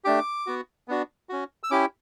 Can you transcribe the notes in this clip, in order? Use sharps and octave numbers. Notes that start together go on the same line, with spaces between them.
A3 D4 G4 D6
B3 F#4
B3 D4 F#4
C#4 F#4
E6
C#4 E4 G4 D6